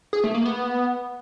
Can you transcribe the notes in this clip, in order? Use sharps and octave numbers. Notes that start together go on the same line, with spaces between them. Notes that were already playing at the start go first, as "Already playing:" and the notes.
G#4
A3
A#3
B3